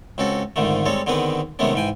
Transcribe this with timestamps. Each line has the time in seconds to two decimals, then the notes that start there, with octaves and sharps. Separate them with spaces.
0.18 C#2 C4 C#4 F#4 A4
0.56 F2 G#2 D3 D#3 A3
0.86 G3 G#3 C4 A4 C#5
1.07 D3 D#3 B3 C4 G#4 B4
1.59 C3 D#3 G#3 A3 B3 C#4
1.74 G#2 E3 G5 G#5